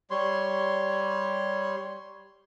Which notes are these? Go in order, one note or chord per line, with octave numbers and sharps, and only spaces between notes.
G3 C#5 C6